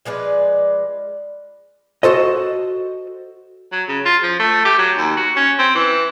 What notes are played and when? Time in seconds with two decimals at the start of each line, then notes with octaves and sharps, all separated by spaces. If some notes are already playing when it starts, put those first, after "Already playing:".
0.05 F3 G#3 B4 D5
2.03 F#4 A4 C5 D#5
3.72 F#3
3.88 C#3
4.06 F4
4.23 F3
4.39 A3
4.65 G4
4.78 F#3
4.97 D#2
5.17 F#4
5.36 C#4
5.59 C4
5.75 E3